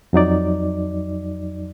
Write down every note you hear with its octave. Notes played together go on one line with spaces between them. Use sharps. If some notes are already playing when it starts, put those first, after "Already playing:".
F2 F#3 D#4 D5